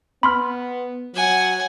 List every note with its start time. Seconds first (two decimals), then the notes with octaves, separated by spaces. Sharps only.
0.23 B3 B5 C6 F6
1.15 F#3 F#5 G#5